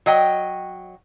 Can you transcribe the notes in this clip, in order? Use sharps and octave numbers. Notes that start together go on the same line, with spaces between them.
F#3 D#5 G5